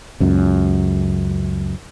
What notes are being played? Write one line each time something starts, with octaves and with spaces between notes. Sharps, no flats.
C#2 F#2